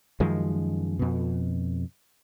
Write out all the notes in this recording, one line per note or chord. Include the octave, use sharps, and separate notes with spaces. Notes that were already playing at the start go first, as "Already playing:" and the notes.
F#2 D#3 F3 G#3
F2 B2